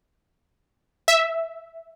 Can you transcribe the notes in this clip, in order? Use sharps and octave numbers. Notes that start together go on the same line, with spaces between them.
E5